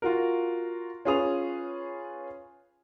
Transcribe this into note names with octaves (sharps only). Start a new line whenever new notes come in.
F4 F#4 A#4
C#4 F4 G#4 B4 D#6 F7